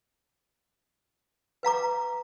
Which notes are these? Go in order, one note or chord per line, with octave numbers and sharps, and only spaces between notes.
B4 F5 A#5 D6